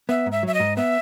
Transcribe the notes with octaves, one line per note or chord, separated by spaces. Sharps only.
B3 E5
G#2
E5
F#3 E5
D#5
G#2
B3 E5